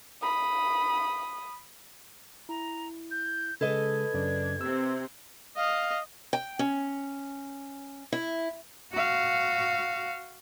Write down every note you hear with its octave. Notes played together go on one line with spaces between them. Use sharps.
B5 D#6
E4 A#5
G6
C#3 G#3 A4 B4 D#5 G#6
F#2 C#3 D4 D5
C3 C4 E6
D#5 F5
G5
C#4
E4
F#4 F5